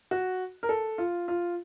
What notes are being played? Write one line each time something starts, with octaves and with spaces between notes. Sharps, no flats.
F#4
A#4
A4
F4
F4